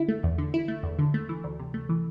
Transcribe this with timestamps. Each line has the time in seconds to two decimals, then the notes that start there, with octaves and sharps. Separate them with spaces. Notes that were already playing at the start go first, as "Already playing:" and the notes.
Already playing: D3 E4
0.08 A3
0.23 E2
0.38 D3
0.54 E4
0.68 A3
0.83 E2
0.99 D3
1.14 A3
1.29 E3
1.44 D2
1.59 C3
1.74 A3
1.89 E3